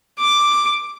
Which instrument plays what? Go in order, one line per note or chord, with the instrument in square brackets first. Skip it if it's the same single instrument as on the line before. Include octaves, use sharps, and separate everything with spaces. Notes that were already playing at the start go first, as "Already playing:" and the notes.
[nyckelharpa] D6